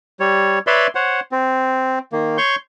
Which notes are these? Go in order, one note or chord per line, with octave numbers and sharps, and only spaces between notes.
G3 C#5
B4 C#5 D5 E5 B5 C6
C5 C#5 F#5
C4
D#3 A#3
C#5 C6 C#6 G6